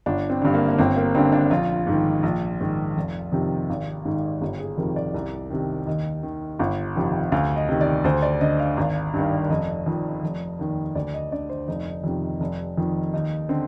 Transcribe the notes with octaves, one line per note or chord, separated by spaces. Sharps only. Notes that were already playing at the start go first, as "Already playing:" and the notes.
G1 D4
C4
G2 D3
A#3
A#3
G1 C4
A#3
G2 D3 C4
D4
A#1 F4
G#2 D#3
A#1
G#2 D#3
F1
F2 C3 D#3
G#1
G#2 D#3
G1 G4
G#4
F2 C3 D#3 A#4
D5
C2
C3 D#3
D#2 D#5
D#3
G1
F2 C3 D#3
D2 F5
D#5
C3 D#3
D5
D2 C5
D5
D3 D#5
F5
G#1
G2 D#3
F1 D#5
F2 D#3
F1
D#2 D#3
D2 D5
D#5
D3 D5
C5
F1 D#4
F2 C3 D#3
F1
F2 D#3
D#2 D#4
D3 C4